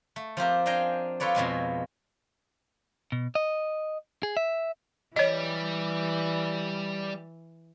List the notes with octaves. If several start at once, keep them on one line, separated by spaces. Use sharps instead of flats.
A3
F3 C4 G4 A#4
D4 D#5 F5 G5 G#5 A#5
F4 A4 B4 C#5 D5
F2 B2 G#3 G#5
B2
D#5
G#4
E5
E3 G3 C#5 D#5